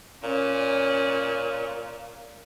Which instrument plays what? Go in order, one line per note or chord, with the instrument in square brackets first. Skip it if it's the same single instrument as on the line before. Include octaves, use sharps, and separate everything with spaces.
[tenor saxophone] A#2 [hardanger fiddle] C#4